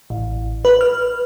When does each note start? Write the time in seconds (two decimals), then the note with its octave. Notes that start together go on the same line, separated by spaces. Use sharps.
0.10 A1
0.65 B4
0.81 F6